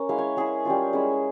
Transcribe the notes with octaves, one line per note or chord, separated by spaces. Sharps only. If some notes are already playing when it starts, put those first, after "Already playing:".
Already playing: C#4 A#4
G#3 E4 F5
C#5
G#3 E4 G#4
G3 C#4 F4
G#3 C#4 E4